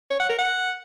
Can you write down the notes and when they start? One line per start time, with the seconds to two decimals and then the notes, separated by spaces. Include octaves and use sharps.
0.10 C#5
0.20 F#5
0.29 A#4
0.39 F#5